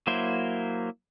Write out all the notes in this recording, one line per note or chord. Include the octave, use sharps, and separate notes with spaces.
F#3 A#3 E4 C5